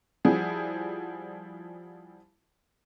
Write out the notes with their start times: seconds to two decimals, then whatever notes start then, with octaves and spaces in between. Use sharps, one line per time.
0.25 F3 G3 E4 F#4 G#4